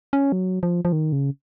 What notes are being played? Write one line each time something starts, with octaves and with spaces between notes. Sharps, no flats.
C#4
F#3
F3
F3
D#3
C#3